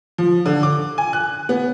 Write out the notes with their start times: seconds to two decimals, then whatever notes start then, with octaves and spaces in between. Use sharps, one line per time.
0.18 F3
0.46 D3
0.63 D6
0.98 G#5
1.13 F#6
1.49 B3